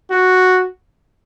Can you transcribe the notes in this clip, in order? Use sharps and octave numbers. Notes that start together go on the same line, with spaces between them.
F#4